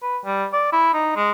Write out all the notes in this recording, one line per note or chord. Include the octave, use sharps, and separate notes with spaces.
B4
G3
D5
E4
D#4
G#3